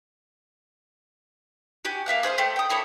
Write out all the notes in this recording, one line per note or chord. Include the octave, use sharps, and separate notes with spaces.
F#4 G4 G#5
A#3 E5 F5 F#6
G#4 C5 D#5 F5
A3 G4 C5
G5 D#6
A#3 E4 A4 C#5